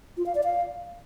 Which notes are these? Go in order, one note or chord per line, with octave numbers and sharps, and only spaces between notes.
F4
F5
D5
F5